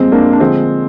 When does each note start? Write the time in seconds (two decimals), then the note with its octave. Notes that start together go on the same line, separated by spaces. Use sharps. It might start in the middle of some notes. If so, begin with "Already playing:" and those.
Already playing: C2 A#2 F3 G#3 C4
0.12 A#3 D4
0.33 D4
0.40 D3 F3 G#3 C4